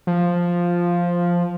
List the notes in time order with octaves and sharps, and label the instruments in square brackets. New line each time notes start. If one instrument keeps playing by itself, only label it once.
[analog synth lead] F3